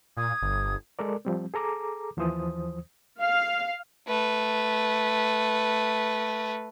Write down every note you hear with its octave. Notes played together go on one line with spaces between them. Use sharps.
A#2 D6 D#6 G#6
G1
G#3 A4 A#4 D5
F3 G3 C4
G#4 A4 A#5 D6
D#2 E3 F3 C5 D#6
F5
A3 B4